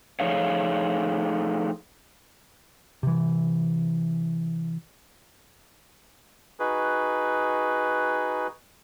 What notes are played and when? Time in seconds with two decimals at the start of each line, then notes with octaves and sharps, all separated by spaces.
0.20 F3 A3 D#4 G#4 C#5 F5
3.03 C3 E3
6.60 D#4 F#4 G#4 B4